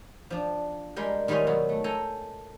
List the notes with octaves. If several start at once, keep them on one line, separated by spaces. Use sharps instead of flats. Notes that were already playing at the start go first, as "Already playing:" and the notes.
F3 D4
G3 G#3 A#4 G5
D#3 G3 G#3 F4 C#5 D#5
B2 F#3
A3
A4 G5 G#5 A#5